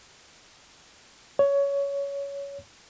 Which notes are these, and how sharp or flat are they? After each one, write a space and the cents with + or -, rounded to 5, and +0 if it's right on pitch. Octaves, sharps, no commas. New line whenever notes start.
C#5 +15